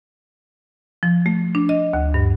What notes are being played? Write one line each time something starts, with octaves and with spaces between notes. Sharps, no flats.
F3
A3
D4
D#5
D2
G2